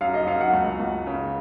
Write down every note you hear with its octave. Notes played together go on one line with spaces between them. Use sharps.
F#2 F5
D#5
F#2 F5
F#5
C#2
C#2
C#3